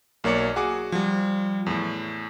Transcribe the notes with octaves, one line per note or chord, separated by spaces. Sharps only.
B1 A#3 C#5 D5 C#7
F#4 G#4 D6
F3 G3
E2 A2